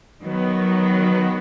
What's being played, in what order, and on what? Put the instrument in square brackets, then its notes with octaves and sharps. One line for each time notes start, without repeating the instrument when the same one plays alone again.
[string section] D#3 F#3 B3